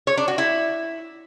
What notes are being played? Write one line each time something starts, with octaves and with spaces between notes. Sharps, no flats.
C#5
D4
F#4
E4